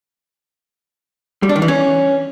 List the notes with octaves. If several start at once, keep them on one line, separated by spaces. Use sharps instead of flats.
G3
D4
D#3
E3
C#4